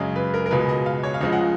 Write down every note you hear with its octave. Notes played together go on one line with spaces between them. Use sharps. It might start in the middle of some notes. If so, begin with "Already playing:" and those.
Already playing: F#2 C#3 G#3
B4
A#4
A#4
C#2 B2 G#3 B4
D#5
F5
C#5
F5
C#2 C#3 F3 G#3 D#5
F#5